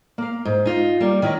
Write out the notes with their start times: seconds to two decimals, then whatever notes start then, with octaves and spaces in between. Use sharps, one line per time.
0.18 A#3 F5
0.45 G#2
0.66 D#4 F4
1.00 G3 A#3
1.22 D#3 C#4 E4 D#5